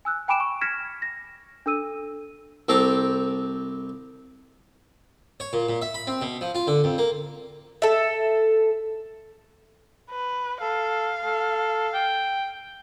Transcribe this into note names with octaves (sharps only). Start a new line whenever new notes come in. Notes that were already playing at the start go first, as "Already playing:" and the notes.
G#5 E6 F#6
G5 G#5 B5 D6 D7 E7
C#6
F6 G#6 A#6 B6 C#7 E7
A#6
D4 A4 E6 D#7
C2 C4 A4 C5 A#5 D6
C#5
A#2
A#2
E5
B5
C4
B2
F3
F4
D3
F2
A#3
A4 E5
B4
A4 F5
A4
G5